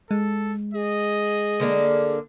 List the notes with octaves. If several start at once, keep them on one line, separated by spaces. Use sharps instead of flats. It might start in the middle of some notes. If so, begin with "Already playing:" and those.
G#3 A4
G#4 D#5
D3 A#3 D4